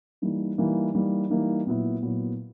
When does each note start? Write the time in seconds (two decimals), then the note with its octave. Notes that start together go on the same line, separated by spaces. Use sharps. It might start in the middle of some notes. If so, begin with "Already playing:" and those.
0.22 E3 G3 A#3 D#4
0.58 E3 G3 A#3 D#4
0.95 E3 G3 A#3 D#4
1.30 E3 G3 A#3 D#4
1.67 A#2 F#3 B3 E4
2.03 A#2 F#3 B3 E4